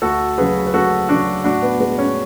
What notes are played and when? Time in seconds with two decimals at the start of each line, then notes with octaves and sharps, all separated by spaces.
0.02 D2 F#4 A4
0.38 C#3 F#3 G#4 B4
0.66 B4
0.74 D2 F#4 A4
1.09 C#3 F#3 D4 F#4
1.44 A2 D4 F#4
1.62 B3
1.80 G#3 B3
1.98 C#4